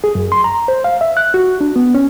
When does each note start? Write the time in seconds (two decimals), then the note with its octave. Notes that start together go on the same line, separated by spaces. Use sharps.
0.04 G#4
0.15 F#2
0.32 C6
0.44 A#5
0.68 C5
0.84 F5
1.01 E5
1.17 F#6
1.34 F#4
1.61 D4
1.76 B3
1.95 C#4